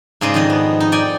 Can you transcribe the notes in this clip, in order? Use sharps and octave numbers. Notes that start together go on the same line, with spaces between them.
G#2 C#3 G#4 D5 D#5 C6
F2 D#3 D#5
B3
D#4
D5 G5 G#5